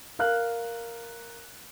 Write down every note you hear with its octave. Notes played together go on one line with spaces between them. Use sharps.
A#4 F5 F6 F#6